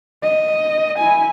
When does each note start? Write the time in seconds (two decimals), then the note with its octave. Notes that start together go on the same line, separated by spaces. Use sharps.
0.23 D#5
0.98 E4 G#5